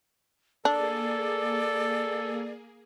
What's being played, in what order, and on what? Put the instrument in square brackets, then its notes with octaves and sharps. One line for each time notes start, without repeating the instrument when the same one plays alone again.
[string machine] A#3 G#4 [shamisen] D4 [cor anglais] A4 [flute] D5